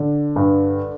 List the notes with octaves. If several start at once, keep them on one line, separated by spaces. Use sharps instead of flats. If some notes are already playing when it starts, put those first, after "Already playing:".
Already playing: D3
G2